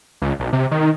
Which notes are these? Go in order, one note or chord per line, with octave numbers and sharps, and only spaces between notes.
C#2
B1
C3
D#3